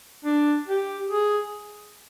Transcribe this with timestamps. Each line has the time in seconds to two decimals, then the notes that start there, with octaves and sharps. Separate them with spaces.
0.24 D4
0.68 G4
1.10 G#4